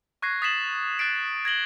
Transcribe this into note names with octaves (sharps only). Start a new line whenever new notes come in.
C#6 F#6 G#6 A#6 C7
D#6 A6 B6 C7 E7 F#7
F#6 A6 C7 D7
G#6 A#6 F#7 G7